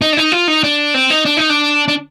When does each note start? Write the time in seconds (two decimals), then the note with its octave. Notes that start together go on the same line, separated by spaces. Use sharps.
0.01 D#4
0.13 D4
0.17 D#4
0.32 F4
0.48 D#4
0.63 D4
0.94 C4
1.10 D#4
1.25 D4
1.37 D#4
1.50 D4
1.88 D4